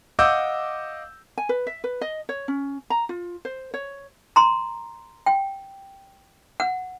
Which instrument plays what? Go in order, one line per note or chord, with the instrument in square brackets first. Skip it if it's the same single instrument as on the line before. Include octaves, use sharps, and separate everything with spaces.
[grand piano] D#5 F5 F#5 D6 E6 G6
[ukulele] G#5
B4
E5
B4
D#5
C#5
C#4
A#5
F4
C5
C#5
[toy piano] A#5 C6
G5
F#5